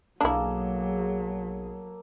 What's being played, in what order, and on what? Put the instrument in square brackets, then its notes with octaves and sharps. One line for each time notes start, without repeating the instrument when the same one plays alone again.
[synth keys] B1 G#4 [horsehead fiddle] F#3 [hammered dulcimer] A#3 A4 [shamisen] D4 E4